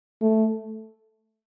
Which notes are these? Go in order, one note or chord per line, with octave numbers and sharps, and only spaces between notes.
A3